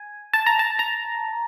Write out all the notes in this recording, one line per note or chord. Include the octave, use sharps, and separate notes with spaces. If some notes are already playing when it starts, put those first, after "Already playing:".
Already playing: G#5
A5
A#5
A5
A#5